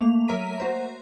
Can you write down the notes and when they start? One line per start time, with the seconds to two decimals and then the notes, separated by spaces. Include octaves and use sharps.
0.01 A3 A#3 F7
0.28 F#3 A#4 E5 A#5 B6 D#7
0.58 F#4 C5 A#5